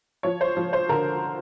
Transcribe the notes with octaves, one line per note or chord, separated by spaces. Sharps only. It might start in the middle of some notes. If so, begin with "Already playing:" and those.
F3 C#5
C5
F3
C5
D3 A#4